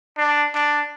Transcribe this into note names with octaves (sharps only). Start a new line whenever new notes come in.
D4
D4